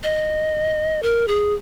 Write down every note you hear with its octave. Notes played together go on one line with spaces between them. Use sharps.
D#5
A#4
G#4